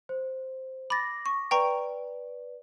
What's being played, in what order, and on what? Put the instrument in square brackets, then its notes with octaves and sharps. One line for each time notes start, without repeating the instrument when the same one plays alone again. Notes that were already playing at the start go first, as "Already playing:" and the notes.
[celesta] C5
[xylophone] B5 A6 [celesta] D6 A#6
[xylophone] C#6
[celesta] B4 D5 [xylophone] G5 A#5 C#6